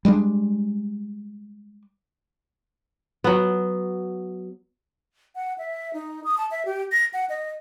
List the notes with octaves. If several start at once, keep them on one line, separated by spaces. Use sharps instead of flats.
G3 G#3 A#3 D4
F#3 B3
F#5
E5
D#4
D#6
A5
E5
G4
A#6
F#5
D#5